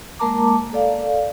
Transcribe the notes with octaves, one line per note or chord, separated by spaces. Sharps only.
G#3 A#3 A#4 A5 A#5 D6
A4 D5 F5